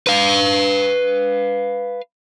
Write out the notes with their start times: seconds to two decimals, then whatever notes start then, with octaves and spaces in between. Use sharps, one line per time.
0.07 B4 F5